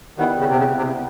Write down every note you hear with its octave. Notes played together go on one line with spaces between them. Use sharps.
D#3 G3 B3 E4
C#3
C3
C#3
C3